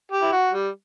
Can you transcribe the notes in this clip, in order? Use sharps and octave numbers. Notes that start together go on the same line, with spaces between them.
G4
E4
F#4
G3